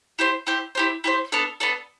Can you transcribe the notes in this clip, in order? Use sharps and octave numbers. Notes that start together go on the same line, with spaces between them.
E4 G4 C5
E4 G4 C5
E4 G4 C5
E4 G4 C5
B3 D4 A4
B3 D4 A4